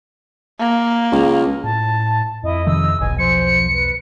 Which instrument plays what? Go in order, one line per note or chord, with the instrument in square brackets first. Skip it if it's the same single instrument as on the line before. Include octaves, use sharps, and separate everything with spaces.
[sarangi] A#3
[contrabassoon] C#2
[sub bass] A2 [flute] A5
[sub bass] F2 [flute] E4 [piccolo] D#5
[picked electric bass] C3 D#3 F3 [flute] E6
[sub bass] F1 [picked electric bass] B1 E2 B2 [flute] G#5
[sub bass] F3 [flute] C5 [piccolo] C#7
[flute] B4